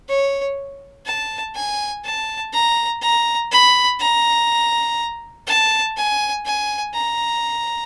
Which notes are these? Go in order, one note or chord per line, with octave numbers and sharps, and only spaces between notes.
C#5
A5
G#5
A5
A#5
A#5
B5
A#5
A5
G#5
G#5
A#5